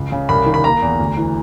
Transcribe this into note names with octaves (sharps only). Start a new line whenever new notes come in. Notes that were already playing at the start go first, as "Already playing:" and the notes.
Already playing: C#2
C#3
C2 B5
D#3
B5
A#3 A#5
E2
D2
E3